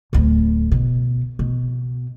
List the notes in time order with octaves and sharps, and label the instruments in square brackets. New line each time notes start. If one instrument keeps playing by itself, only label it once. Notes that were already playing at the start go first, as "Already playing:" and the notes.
[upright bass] D1 D2
B2
B2